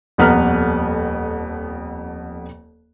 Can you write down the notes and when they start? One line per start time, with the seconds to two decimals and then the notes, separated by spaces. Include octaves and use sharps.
0.18 D#1 F2 B3 B4 A#5 F6